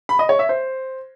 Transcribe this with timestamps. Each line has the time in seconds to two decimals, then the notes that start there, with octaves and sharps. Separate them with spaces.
0.09 B5
0.19 D#5
0.29 C#5
0.39 E5
0.49 C5